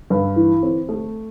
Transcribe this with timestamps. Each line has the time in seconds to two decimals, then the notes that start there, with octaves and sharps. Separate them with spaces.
0.10 G2
0.36 E3
0.63 C4
0.89 A3